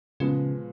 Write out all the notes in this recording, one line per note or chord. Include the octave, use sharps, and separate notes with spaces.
A#2 C#3 F3 G#3 B3